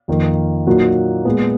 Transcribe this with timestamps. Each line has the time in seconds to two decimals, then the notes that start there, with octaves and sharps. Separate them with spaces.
0.08 F2 D#3 A#3
0.67 A#2 F#3 A#3 D#4 F#4
1.25 A#2 G#3 B3